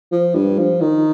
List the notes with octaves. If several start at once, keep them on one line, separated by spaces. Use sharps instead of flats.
F3
G2
F3
D#3